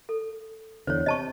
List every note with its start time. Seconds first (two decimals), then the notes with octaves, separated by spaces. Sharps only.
0.09 A4
0.87 E2 D3 C5 C#5
1.06 C3 D#5 A5 C#6